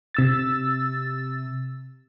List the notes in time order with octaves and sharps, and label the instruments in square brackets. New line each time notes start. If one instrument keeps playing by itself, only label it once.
[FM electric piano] C3 E6 A6